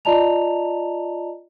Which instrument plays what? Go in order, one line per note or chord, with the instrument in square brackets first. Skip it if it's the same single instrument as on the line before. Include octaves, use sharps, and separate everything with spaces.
[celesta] F4 D5 D#5 A5 A#5 F7